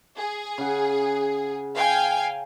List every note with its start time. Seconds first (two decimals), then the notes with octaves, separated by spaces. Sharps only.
0.18 G#4
0.58 C#3 F#5
1.75 F5 G5 G#5